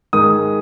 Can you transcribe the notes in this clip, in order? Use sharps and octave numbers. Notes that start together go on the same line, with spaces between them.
G#2 D#3 G#3 D#6